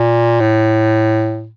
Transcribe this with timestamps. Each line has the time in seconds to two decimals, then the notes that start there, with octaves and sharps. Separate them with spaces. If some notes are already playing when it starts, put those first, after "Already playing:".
Already playing: A#2
0.40 A2